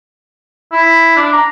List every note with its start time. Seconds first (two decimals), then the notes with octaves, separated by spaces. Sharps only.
0.72 E4
1.17 D4
1.33 A#5